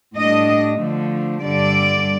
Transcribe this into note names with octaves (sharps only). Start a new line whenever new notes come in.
A2 G3 D4 D#5
D3 F3 A3
G2 D3 G3 D5